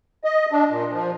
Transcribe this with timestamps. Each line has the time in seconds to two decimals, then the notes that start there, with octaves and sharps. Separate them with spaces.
0.24 D#5
0.52 D4
0.70 A#2
0.92 F3